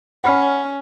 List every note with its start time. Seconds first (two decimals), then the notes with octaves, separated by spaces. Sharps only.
0.24 C#4 F#5 B5 F6